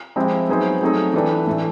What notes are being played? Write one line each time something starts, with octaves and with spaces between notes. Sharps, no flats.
F3 G#3 C4 E4 G4
F#3 B3 D#4 G#4 C5
F#3 A3 C4 D#4 G#4
E3 A3 D4 G4 B4
A2 E3 A3